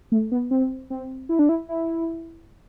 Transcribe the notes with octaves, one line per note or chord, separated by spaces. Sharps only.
A3
B3
C4
C4
E4
D4
E4
E4